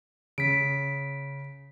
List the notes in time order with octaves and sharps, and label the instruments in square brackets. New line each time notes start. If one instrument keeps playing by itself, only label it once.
[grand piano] C#3 [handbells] B6 D7